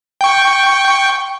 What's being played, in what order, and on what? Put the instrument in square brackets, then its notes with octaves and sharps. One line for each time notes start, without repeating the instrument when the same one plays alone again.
[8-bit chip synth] G5 C#6